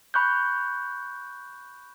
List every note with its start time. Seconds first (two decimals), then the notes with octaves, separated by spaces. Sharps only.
0.14 B5 C#6 F#6 G6